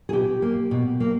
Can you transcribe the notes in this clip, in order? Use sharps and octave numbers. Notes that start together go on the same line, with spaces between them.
G#4
B2 G4
A#3
B2
A#3